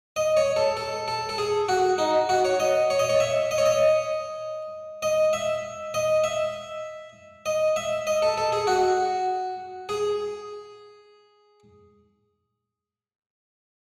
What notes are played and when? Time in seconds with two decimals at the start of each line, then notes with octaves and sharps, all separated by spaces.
0.16 D#5
0.37 C#5
0.56 A4
0.77 A4
1.08 A4
1.29 A4
1.38 G#4
1.69 F#4
1.98 D#4
2.29 F#4
2.45 C#5
2.60 D#5
2.90 C#5
2.99 D#5
3.09 C#5
3.20 E5
3.51 D#5
3.58 C#5
3.66 D#5
5.02 D#5
5.33 E5
5.94 D#5
6.24 E5
7.46 D#5
7.76 E5
8.07 D#5
8.22 A4
8.38 A4
8.52 G#4
8.67 F#4
9.89 G#4